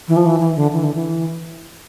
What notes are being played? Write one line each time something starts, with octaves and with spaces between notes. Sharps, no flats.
E3
F3
E3
E3
D3
E3
D3
E3